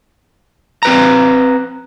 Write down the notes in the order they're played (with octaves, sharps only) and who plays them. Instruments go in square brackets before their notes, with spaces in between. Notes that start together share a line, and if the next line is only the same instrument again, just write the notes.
[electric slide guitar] C4 B4 A#5